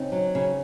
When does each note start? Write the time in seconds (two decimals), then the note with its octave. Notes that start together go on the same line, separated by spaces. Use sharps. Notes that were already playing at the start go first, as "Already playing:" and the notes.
Already playing: C#3 C4 D#4
0.12 F#3
0.35 C#3